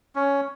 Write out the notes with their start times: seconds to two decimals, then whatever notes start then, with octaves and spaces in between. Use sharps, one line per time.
0.16 C#4